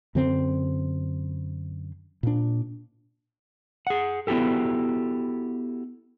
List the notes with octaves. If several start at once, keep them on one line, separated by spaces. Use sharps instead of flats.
F#2 D3 C4
A#2 D4
G#4 F#5
B3 E4 F#4 G4 A4